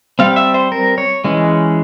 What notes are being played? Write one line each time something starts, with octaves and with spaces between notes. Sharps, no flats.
G3 C4 F5
E5
C5
A#4
C#5
E3 G#3 C#4